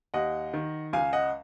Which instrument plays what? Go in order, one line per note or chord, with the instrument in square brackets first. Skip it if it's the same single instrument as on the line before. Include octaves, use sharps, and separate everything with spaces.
[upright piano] D#2 D#5 F#5
D#3
C#2 F5 G#5
D#5 F#5